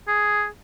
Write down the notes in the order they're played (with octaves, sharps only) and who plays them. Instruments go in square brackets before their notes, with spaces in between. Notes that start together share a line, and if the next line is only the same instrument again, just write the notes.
[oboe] G#4